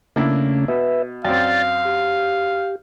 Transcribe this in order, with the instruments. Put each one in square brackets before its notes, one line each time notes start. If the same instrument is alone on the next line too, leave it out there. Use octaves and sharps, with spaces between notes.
[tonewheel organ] C#3 A3 C#4 [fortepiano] A#3 D4 E4
[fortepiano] B2 [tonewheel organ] B4 E5
[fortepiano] F#2 C4 [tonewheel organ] D5 G5 A6 [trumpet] F5
[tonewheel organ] G4